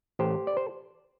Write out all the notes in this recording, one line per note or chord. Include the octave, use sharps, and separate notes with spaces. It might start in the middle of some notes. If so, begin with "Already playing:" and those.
A1 G4 C5
D5
C5